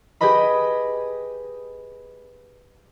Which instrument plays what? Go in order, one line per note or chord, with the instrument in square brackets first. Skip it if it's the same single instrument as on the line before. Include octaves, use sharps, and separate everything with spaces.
[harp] G4 G#4 B4 D#5 B5